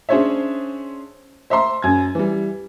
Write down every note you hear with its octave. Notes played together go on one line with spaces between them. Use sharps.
C#4 D4 G#4 C5 C#5 E5
C5 E5 A#5 C6
F#2 G#6
E3 G3